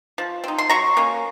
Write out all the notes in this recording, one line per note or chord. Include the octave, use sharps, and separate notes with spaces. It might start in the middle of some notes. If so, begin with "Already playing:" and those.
F3
C4 D#4
C6
F#3 A#5 C#6
A#3 C#4